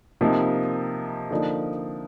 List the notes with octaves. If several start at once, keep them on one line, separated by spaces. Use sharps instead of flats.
C3 F3 A#3 D#4
D3 F3 A#3 D#4